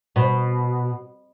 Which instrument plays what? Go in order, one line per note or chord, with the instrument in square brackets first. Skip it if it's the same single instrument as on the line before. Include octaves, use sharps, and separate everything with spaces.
[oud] B2